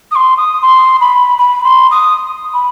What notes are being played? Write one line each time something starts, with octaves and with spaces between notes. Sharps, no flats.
D#6
C6
D#6
C6
B5
B5
C6
D#6
B5